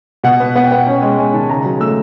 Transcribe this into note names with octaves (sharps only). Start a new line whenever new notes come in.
B2 F#5
B3
B3 F#5
G5
B3 F#5
C#4 G5
G#3
G#3 G#5
D#3 A5
C#3 A#5
F#3
A3 E6